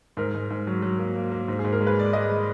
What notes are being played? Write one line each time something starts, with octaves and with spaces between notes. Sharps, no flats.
G#2 A#4
G#2
G#2
F#3
F#3
A#3
A#3
A#3
G#2
G#4
G#2
A#4
G#3
B4
G#3 D5
G#3 D#5
G#3